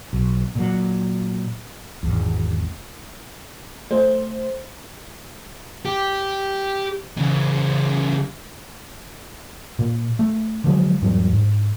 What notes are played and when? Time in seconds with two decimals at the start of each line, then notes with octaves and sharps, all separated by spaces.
0.13 B1
0.55 A#2 F#3
2.03 G#1 E2
3.91 A3 C5
5.85 G4
7.17 C#3 E3
9.79 A#2
10.19 A3
10.64 D3 F3 F#3 G#3
11.02 E2 G#2 F#3 G3
11.33 G#2